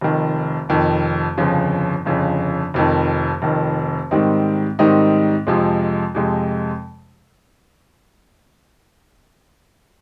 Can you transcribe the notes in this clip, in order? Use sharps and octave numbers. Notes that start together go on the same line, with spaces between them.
F1 F2 D#3
F1 F2 D#3
G1 F2 C#3 F3
G1 F2 C#3 F3
F1 F2 D#3
F1 F2 D#3
G#2 D#3 G3 C4 D#4
G#2 D#3 G3 C4 D#4
F2 C3 F3 G#3
F2 C3 F3 G#3